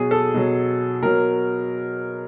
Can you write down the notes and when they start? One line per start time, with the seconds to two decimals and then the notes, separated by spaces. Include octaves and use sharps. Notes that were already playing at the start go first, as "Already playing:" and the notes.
Already playing: B2 F#3 G#4
0.11 A4
0.34 B2 F#3
1.02 B2 F#3 A#4